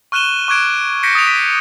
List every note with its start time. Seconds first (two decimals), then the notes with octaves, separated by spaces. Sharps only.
0.12 C#6 F6 F#6 D#7 E7 G7
0.48 C#6 D6 F#6 G#6 D7 E7
1.03 G6 A#6 B6 C#7 D7
1.15 D#6 A6 B6 D7 F7
1.27 B6 D#7